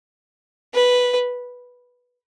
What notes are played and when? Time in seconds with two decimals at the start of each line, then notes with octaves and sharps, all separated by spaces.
0.74 B4